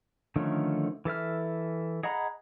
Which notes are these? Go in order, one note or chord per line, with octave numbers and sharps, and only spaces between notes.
D3 D#3 F3 A3 C#4
E3 A4 E5 F6
G#4 D#5 F#5 A#5 B5